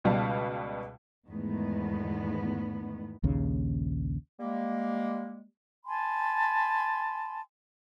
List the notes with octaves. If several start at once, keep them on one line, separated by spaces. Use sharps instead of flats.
C#2 B2 G3 F5 A5
E2 G#2 D#3 G#3 A3 B3
A#1 D#2 C#3
G3 G#3 A#3
G#5 A5 B5 C6